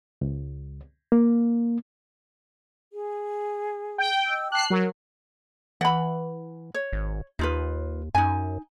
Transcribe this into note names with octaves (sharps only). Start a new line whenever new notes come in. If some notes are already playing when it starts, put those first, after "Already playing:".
C#2
A#3
G#4
G5
D#5 E6
G5 A5 D6 F#6 C7
F#3 A#4
E3 F#5 B5
C#5
G#1
D#2 D#4 F4 B4
F#2 D#4 G#5